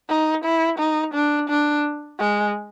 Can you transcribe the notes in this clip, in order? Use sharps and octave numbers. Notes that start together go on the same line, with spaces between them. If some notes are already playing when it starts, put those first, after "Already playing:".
D#4
E4
D#4
D4
D4
G#3